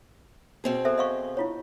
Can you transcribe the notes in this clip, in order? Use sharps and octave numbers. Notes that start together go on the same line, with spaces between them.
B2 C4 G#4
A4 C5 E5
D#5 F5 C#6
E4 F4 C#5